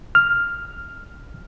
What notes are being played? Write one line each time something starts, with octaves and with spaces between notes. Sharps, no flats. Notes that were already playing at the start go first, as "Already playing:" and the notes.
F6